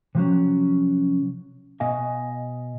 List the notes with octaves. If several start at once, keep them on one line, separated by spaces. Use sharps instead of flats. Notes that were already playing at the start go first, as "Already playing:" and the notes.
C3 F3 F#3 C#4
B2 D#5 F5 G#5